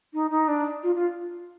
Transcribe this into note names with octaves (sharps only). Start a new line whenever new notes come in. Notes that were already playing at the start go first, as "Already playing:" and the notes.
D#4
D#4
D4
F4
F4